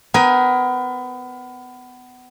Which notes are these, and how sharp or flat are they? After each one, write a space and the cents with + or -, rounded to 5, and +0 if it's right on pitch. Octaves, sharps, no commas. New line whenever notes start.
B3 +25 A#4 +25 G#5 -5